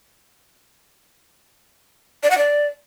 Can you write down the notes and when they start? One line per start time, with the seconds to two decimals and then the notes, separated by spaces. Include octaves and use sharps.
2.23 D5
2.31 F#5
2.38 D5